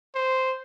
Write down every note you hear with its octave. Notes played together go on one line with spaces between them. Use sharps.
C5